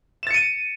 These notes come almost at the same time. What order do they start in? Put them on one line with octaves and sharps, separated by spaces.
E7 A6 C#7 D#7